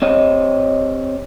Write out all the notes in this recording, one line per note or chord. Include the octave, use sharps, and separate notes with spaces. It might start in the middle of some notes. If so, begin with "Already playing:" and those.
C4 G4 C#5 D#5